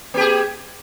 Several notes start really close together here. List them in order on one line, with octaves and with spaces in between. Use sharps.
A#3 G4 G#4